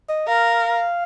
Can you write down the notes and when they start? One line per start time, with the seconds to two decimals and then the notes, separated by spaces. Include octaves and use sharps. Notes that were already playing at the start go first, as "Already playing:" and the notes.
0.09 D#5
0.28 A#4 F5